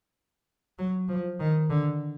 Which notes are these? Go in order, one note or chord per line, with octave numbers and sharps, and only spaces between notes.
F#3
F3
D#3
D3